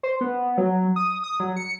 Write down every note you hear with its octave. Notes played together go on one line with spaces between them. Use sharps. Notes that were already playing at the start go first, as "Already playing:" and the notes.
C5
B3
F#3
D#6
D#6
F#3
C#7